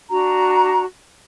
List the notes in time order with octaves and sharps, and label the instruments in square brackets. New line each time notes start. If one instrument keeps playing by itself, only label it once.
[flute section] D4 F#4 A#5